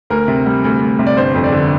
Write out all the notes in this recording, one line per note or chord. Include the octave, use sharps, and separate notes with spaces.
D2 A#4
C3
G3
D2
D2
C3
D5
G1 C5
F2
D5
D3